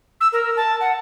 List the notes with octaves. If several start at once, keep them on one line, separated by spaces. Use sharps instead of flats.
E6
A#4
A5
F#5